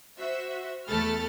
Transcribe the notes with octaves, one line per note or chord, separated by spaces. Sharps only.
F#4 C5 E5
E2 A3 A4 B5 F6 A6